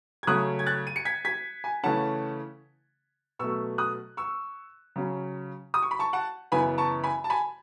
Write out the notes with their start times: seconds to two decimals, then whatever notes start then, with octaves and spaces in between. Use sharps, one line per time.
0.23 G#6
0.27 C#3 F#3 A3 C#4 D#6 F#6
0.59 G#6
0.66 F#6 A6
0.87 D#7
0.96 C#7
1.05 G#6 B6
1.25 G#6 B6
1.64 G#5
1.83 C#3 E3 A3 C#4 F#5 A5
3.39 B2 F#3 A3 C#6 E6
3.78 D#6 F#6
4.17 C#6 E6
4.96 C#3 F#3 C#4
5.74 D#6
5.83 C#6
5.91 B5
5.99 A5 C#6
6.13 F#5 A5
6.52 F#2 C#3 E3 B3 G#5 B5
6.78 A5 C#6
7.04 G#5 B5
7.24 A5
7.30 G#5 B5